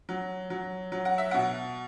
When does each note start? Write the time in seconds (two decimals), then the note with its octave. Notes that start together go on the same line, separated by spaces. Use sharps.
0.09 F#3
0.50 F#3
0.92 F#3
1.05 F#5
1.18 E5
1.31 B2 F#5